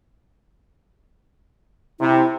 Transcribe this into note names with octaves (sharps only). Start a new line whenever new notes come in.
C3 E4